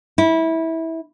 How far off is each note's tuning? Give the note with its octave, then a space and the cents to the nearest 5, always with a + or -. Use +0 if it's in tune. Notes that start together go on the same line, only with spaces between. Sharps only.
E4 -20